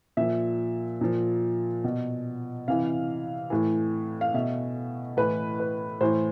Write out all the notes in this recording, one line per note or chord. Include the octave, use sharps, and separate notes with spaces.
A#2 F3 E5
A#2 F3
B2
C3 E3 F5
A2 E3
F5
B2 E5
A2 E3 B4
B4
A2 E3 C5